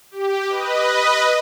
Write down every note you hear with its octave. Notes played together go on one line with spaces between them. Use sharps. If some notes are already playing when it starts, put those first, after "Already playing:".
G4
B4 D#5